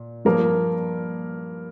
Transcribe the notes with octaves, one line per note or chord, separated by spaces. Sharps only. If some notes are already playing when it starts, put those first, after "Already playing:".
Already playing: A#2
G2 F3 A#3 A#4